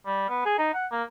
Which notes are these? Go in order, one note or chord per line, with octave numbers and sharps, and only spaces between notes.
G3
B3
G#4
D#4
F#5
A#3